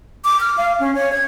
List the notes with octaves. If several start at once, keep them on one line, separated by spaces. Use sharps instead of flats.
D6
F6
F5
C#4
C#5
G#6